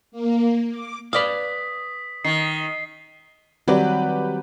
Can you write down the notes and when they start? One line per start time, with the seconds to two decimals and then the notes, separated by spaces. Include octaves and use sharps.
0.12 A#3
0.70 D6
1.13 B4 D5 F5 D#6 B6
2.25 D#3 C7
3.68 D#3 F#3 G3 C4 G4 B4 D5